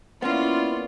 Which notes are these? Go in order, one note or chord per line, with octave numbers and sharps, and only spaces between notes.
A#3 B3 C#4 E4 F4 D5